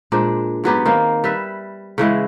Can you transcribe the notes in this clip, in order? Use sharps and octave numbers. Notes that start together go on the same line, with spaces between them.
A#2 G#3 D4 C5
G#2 F#3 B3 G4
D#3 A#3 C4
G3 B4 E5
C#3 E3 G#3 E4